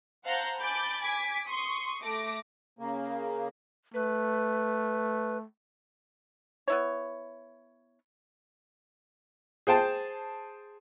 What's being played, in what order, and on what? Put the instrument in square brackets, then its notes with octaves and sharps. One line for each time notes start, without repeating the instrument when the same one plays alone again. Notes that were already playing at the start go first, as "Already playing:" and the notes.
[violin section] C5 F5 F#5 A5 A#5 G6
G#5 A5 B5 D6 G6 A6
G#5 D6 G#6 B6
C6 C#6 D#6
A3 D6 A#6
[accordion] C#3 A#3
[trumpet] A3 [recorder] B4
[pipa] B3 E4 C#5
[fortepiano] G#4 C5 G5 A5